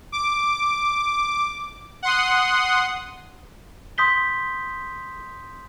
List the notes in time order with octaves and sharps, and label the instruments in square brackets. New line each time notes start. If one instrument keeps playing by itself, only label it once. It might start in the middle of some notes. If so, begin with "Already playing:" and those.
[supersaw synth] D6
F#5 C6 D#6
[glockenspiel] C6 D#6 G6 B6 G7